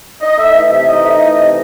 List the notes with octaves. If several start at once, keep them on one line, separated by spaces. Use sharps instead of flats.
D#4 D#5
A3 E5
E3 E5
C3 E5
D#4 D#5
A3 E5
D#5
E3
D#5
C3